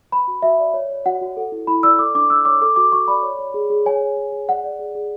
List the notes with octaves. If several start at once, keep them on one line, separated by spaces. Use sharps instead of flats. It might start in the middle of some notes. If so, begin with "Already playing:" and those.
B4 B5
F#4
F#4 E5
D5
C#5
C#5
F#4 F#5
F#4
A4
E4
E4 B5
D5 E6
A4 D6
D4 D6
D4 E6
C#5 D6
A4 D6
F#4 D6
F#4 C#6
D5 B5
C#5
C#5
G#4
G#4
C#5 G#5
C#5
G#4
G#4
D5 F#5
D5
G#4
G#4